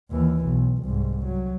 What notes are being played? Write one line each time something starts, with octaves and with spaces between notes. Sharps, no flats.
D#2 E3
B1
C2 G#2
F#3